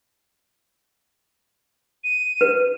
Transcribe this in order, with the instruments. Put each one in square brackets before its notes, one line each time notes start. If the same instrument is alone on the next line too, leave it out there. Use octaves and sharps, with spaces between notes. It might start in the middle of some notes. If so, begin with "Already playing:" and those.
[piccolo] D#7
[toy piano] B4